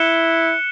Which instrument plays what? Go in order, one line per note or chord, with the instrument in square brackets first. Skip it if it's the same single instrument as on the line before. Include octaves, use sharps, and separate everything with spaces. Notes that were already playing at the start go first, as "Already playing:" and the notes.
Already playing: [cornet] E4 [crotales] F#6 C#7 E7 G7